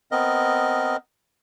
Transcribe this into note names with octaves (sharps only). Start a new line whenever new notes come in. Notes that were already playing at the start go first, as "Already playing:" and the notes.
B3 C4 A#4 D#5